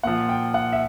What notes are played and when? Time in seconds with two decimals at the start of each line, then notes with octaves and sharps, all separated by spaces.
0.03 A#2 F3 F#5
0.29 G5
0.54 F#5
0.73 E5